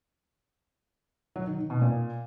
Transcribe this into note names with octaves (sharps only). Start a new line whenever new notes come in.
F#3
D#3
D#3
B2
A#2